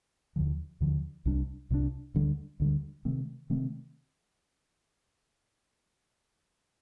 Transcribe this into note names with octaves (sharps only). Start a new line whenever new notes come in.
D#2 D3 F3
D#2 D3 F3
C2 C3 G3 D4
C2 C3 G3 D4
D2 D3 G3
D2 D3 G3
C3 D#3 A3 C4
C3 D#3 A3 C4